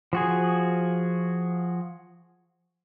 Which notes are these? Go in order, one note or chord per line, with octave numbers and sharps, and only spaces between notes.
F3 F#4 G#4